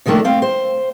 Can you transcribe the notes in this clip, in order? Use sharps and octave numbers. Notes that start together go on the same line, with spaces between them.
C3 D#3 F3 A3 A#3 D4
A3 C4 F5
C5